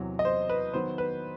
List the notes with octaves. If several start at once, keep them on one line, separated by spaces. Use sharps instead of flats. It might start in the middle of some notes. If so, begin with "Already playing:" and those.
Already playing: E2 C3 F#3
D#5
C5
B4
D#3 F#3 B3 C5
B4